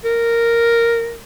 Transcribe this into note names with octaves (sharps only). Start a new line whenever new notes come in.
A#4